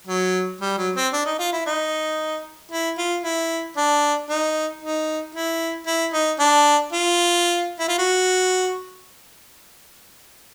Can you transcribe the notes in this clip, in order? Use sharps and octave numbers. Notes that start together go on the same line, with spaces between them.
F#3
G3
F#3
C4
D4
D#4
F4
E4
D#4
E4
F4
E4
D4
D#4
D#4
E4
E4
D#4
D4
F4
E4
F4
F#4